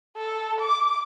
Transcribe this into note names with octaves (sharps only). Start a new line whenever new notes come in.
A4
D6